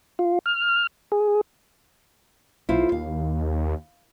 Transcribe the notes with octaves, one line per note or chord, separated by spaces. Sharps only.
F4
F6
G#4
B1 E4 F4 C5
D#2 F5